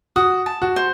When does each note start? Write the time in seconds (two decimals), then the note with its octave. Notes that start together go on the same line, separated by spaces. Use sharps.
0.16 F#4 D#6
0.46 A5
0.62 F#4
0.76 C5